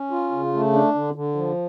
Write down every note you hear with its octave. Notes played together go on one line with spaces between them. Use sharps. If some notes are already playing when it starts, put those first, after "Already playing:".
Already playing: C#4
F4
C#3
A3
D4
D3
D3
F3